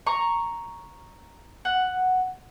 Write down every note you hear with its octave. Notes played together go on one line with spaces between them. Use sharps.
A#5 C#6
F#5